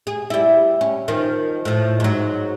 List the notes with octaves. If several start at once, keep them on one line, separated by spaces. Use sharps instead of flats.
G#4
G3 E4
C#4
D#3 F3
A2 F3
G#2 F#3